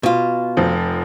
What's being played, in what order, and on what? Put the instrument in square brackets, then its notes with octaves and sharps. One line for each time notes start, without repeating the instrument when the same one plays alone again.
[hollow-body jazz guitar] B2 F4
[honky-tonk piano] F1 F3